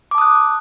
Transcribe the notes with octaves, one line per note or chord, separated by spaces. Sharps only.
A5 D6 D#6 F#6